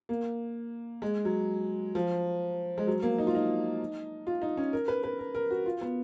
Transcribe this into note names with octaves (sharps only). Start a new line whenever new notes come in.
A#3
G#3
F#3
F3
G#3
F#3
A#3
D#4
F4
D#4
F4
D#4
C#4
A#4
B4
B4
A#4
A#4
F#4
F4
B3